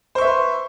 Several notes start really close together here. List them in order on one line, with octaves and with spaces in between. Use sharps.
C5 C#6 E5 B4 C6